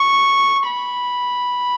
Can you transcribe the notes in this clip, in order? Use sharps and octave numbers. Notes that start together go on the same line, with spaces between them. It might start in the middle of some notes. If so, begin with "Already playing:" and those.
Already playing: C#6
B5